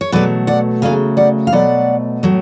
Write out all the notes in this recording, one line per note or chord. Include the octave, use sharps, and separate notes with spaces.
C#5
B2 F#3 A3 B4 D5
D5 F#5
C#3 F#3 A3 F5 G#5
D5 F#5
F5
B2 F#3 A3 D5 F#5
A2 F#3 A3